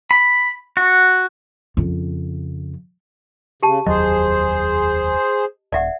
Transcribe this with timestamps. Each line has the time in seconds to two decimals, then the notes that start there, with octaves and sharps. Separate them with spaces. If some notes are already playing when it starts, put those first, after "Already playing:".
0.11 B5
0.77 F#4
1.77 F2 C#3
3.63 C#3 G4 A5
3.86 F1 D#2 F#3 G#4 C5 D#5
5.72 D#1 D5 E5 F#5